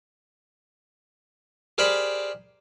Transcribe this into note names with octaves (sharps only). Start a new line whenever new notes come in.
G4 G#4 A#4 C5 D5 B5